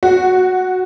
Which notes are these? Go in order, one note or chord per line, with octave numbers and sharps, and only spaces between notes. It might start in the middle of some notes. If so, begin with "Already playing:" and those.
F#4